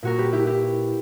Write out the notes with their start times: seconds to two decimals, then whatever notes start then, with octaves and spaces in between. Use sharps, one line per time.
0.03 A#2 A#3 F#4 A#4
0.18 G4 B4
0.33 E4 G4
0.47 E4 G4